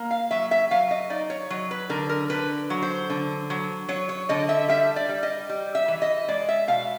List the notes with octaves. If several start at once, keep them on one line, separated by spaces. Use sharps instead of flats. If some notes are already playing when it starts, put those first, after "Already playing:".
Already playing: A#3
F5
F#3 E5
E5
F#3 F5
D#5
D#4 D5
C#5
F#3
B4
D3 A#4
A#4
D3 B4
F#3
C5
D3
F#3
F#3 C#5
C#5
D3 D#5
E5
G3 E5
D5
G3
D#5
G3
E5
E3
D#5
G#3 D5
E5
B2 F5